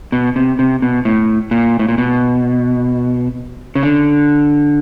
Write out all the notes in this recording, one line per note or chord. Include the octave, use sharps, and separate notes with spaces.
B2
C3
C3
B2
A2
A#2
A2
A#2
B2
C#3
D3